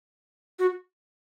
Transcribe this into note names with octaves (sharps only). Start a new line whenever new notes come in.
F#4